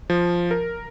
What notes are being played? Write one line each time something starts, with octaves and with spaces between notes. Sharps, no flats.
F3
A#4